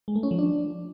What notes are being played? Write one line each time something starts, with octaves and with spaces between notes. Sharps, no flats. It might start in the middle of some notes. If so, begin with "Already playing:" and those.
G#3
A3
C#4
F3
D4